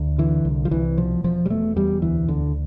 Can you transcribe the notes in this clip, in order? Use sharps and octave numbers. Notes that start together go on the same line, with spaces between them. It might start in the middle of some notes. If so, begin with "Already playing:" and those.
Already playing: D2
D3 E3
C2
F3
C2 E3
B2 F3
E1 F3
G3
B2 A3
E2 G3
D2 E3
D2 D3